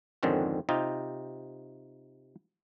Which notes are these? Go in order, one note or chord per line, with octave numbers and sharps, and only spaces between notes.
F2 G#2 D3 D#3 C4 C#4
C3 D#4 F4 G4